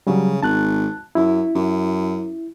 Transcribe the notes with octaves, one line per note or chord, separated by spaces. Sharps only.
C#3 F#3 G3
G#1 A5 F#6
F#2 E4
F#2